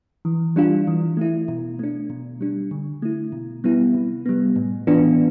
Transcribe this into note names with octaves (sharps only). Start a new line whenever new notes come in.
E3
G3 D4 F4
E3
A3 E4
B2
A3 D4
B2
G3 D4
D3
A3 E4
B2
G3 B3 E4
C3
G3 B3
A2
E3 B3 D4 F4